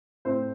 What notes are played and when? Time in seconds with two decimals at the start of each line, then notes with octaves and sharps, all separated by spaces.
0.25 A2 C4 C5